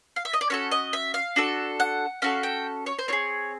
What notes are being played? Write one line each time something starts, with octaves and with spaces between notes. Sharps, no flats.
F5
E5
D#5
D5
C#4 F#4 A4 C#5
D#5
E5
F5
D4 F#4 A4
F#5
C#4 F#4 A4 F5
G5
C#5
C5
C4 F4 G#4 C#5